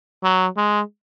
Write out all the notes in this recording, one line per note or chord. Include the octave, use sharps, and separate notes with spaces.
F#3
G#3